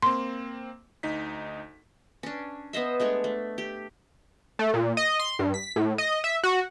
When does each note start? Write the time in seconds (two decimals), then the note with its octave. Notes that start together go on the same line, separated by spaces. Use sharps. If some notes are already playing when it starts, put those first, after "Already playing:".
0.02 A#3 C4 C6
1.03 D2 D#4 B6
2.23 C#4 D4
2.73 B3 C5 D#5 E5
3.00 G#3 A3 D4 C#5
3.24 A3
3.58 G4
4.59 A3
4.74 A#2
4.97 D#5
5.19 C6
5.39 G2
5.54 B6
5.76 A2
5.98 D#5
6.24 E5
6.44 F#4